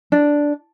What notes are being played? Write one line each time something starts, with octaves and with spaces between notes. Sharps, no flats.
D4